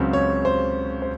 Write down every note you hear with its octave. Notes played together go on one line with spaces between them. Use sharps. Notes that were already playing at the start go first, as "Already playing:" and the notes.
Already playing: C#2 C#3 F#3 C4
C#5
C5
C5